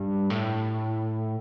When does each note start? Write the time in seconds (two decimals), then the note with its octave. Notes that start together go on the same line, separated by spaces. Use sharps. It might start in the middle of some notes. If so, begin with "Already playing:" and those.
Already playing: G2
0.30 A2